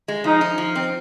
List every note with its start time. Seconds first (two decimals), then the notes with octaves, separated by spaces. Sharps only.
0.08 G#3
0.24 F3 D#4
0.41 D#4
0.58 F3
0.76 C4